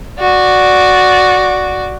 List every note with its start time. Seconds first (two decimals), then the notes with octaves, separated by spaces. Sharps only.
0.20 F#4 D5